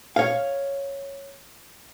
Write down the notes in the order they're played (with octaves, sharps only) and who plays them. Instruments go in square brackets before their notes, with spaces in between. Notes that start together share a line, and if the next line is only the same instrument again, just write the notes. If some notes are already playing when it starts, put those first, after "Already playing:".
[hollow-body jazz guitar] C#5 F5